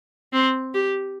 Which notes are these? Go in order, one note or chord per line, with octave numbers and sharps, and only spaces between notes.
C4
G4